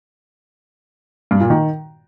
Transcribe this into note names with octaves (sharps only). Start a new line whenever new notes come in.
G2
A#2
D#3